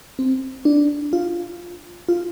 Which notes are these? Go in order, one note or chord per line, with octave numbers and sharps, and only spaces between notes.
C4
D4
F4
F4